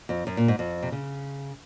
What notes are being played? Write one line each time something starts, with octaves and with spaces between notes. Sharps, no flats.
F2
F#2
A#2
G#2
F2
C3
C#3